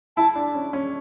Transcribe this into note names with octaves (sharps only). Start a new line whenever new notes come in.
E4 A5
D4
C#4
C#4